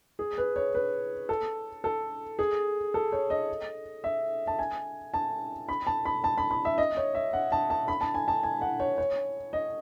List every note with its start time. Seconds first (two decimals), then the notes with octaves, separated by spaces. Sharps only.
0.19 G#4
0.38 B4
0.56 C#5
0.75 B4
1.29 A4
1.84 A4
2.39 G#4
2.94 A4
3.12 C#5
3.30 D#5
4.04 E5
4.47 A5
4.59 G#5
5.14 A5
5.69 B5
5.87 A5
6.05 B5
6.24 A5
6.38 B5
6.51 B5
6.65 E5
6.78 D#5
6.97 C#5
7.15 E5
7.33 F#5
7.52 A5
7.70 A5
7.88 B5
8.01 A5
8.14 G#5
8.28 A5
8.43 G#5
8.61 F#5
8.80 C#5
8.98 C#5
9.53 D#5